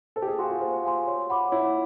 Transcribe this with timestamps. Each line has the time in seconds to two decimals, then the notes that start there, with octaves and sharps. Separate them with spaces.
0.16 A4 C5
0.22 G4
0.27 G#4
0.39 F#4 F5 G#5 C6
0.50 F4
0.61 C5
0.84 F5 G#5 C6
1.07 C#5
1.30 F#5 B5 D6
1.52 E4 C#5